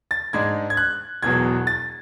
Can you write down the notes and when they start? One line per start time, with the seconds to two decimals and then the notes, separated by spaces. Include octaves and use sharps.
0.11 A6
0.33 G#2 G#3 D4 G#6
0.70 G#6
0.77 F#6
1.22 E1 E2 B2 F#3 G#6
1.67 A6